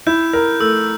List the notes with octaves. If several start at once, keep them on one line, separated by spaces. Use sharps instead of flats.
E4 G6
A#4
A3 E6